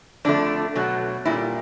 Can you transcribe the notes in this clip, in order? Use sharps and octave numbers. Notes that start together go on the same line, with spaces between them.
F2 D3 F3 A3 D4
B2 F#3 A3
A#2 G3 E4